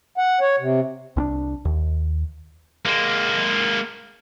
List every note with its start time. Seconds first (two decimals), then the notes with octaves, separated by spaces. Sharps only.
0.18 F#5
0.41 C#5
0.60 C3
1.16 C2 C#4 D4
1.65 D#2
2.85 G#3 A#3